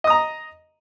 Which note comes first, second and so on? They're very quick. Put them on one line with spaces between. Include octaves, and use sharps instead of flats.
D#5 D#6 A#5